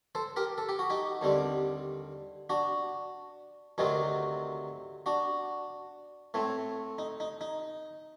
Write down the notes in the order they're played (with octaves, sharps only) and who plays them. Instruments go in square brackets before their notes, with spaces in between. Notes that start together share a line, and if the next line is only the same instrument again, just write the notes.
[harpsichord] A4 C5
G4 A#4
A4
G4
F#4
D#4 G4
D#2 D3 G3 C4
D4 F#4
D2 C3 D#3 F#3 C4 D#4
D4 F#4
A2 A3 C4
D#4
D#4
D#4